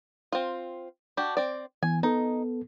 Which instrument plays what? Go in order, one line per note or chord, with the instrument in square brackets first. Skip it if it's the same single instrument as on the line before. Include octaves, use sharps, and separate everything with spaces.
[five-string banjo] C4 F4
D4 F#4 G4
C4 D5
[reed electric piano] E3 B3 [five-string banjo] G#5
[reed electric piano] B3 A4 [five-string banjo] D#4